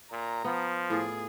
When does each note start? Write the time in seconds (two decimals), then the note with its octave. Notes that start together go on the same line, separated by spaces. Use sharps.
0.11 A#2 A#5
0.44 F3 B3
0.90 A2 F4 G#4 D5